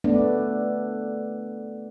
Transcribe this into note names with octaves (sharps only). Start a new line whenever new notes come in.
A3 B3 D4